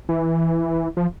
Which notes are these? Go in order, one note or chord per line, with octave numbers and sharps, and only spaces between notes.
E3
F3